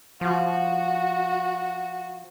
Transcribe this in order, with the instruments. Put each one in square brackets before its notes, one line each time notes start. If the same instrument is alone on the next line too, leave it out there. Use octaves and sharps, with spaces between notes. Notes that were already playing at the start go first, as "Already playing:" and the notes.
[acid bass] F3 [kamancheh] F#4